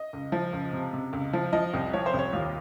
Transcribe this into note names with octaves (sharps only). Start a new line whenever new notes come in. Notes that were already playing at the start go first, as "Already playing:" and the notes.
Already playing: D#5
C#2
F3
C#2
C3
C3
C#2
F3
F3 D#5
C2
F3 C#5
C5
C2
C#5
D#2 F4